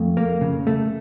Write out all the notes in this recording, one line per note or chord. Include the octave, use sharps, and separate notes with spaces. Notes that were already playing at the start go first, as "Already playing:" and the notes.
Already playing: F2 A3
A#3
C#3
A3